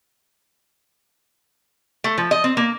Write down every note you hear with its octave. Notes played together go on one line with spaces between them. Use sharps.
A3
F3
D#5
C4
A#3